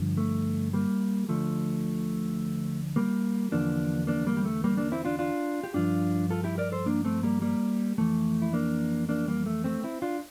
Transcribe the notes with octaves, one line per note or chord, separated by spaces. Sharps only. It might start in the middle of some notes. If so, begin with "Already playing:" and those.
Already playing: G2 D3 F3
A3
G3 A#3
D2 D3 F3 A3
G3 A#3
E2 D3 F3 A#3 D4
A#3 D4
G3 A#3
G3
A3
G3 A#3
A#3 D4
C4 E4
D4 F4
D4 F4
G4
G2 F3 D4 F4
F4 A4
E4 G4
A#4 D5
A4 C5
A#3 D4
A3 C4
G3 A#3
G3 A#3
F2 E3 A3
E4
A#3 D4
A#3 D4
G3 A#3
A3
A3 C4
C4 E4
D4 F4